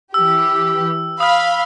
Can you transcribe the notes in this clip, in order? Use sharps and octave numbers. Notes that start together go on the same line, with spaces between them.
E3 G4 E6
F5 B5 D#6 F6